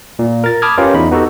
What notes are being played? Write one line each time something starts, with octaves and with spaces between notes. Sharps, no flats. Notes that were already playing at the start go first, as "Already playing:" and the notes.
A#2
A#4 A6
A5 B5 D6 D#6 F6 G#6
C#4 F4 G4 A#4 B4 C#5
E2 D#4 B5
B3 D#4 F#4 G4 A4